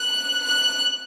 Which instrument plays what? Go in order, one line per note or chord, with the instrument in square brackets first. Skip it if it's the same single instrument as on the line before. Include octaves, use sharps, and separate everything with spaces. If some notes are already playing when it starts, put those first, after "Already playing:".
Already playing: [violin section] F#6
F#6